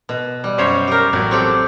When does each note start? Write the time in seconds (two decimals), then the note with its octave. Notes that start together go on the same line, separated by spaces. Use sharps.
0.09 B2
0.44 G3
0.58 F#2 C5 C#5
0.87 G4 A#4
1.13 A1 F#3
1.31 C4 G4 A4